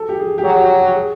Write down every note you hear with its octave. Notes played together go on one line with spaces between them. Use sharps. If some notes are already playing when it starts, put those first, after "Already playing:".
Already playing: A4
G4
G#4
G4
F#3 G#4
G4
F#4
G4
G#4